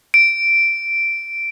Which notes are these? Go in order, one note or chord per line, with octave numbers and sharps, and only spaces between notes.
D7